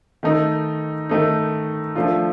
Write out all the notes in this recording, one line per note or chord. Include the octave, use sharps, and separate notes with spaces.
D#3 A3 D#4
D#3 A3 D#4
F3 A3 D4 F4